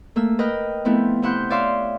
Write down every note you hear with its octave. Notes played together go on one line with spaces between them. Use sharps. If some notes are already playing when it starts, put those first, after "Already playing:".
A3 A#3 E6
A#4 B4 D#5 G5 D#6
F3 A3 B3 C4 E4
C3 E4 F#5 C6 G6
C#5 D5 E5 F5 C6